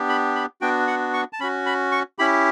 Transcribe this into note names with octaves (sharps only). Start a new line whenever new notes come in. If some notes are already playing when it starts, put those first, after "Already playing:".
Already playing: B3 D4 G4
B5
B5
B3 D4 F#4 G5
F#5
C#6
A5
C#4 F#4 B5
B5
C#6
C#4 E4 G4 B5